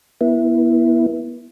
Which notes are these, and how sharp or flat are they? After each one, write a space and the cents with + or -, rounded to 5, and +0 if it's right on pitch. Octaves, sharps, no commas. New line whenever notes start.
B3 -30 E4 +0